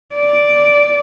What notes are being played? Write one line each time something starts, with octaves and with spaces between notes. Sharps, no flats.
D5